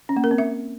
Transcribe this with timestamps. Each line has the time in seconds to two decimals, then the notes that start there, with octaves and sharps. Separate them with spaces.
0.09 C#4
0.16 A#3
0.24 A#4
0.31 C4
0.38 E5